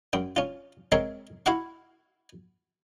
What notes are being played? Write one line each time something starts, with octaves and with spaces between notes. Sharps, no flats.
F#2 G5
C#4 F4
G#3 C4 A#4 C#5 E5
E4 F#4 F5 F#5 C#6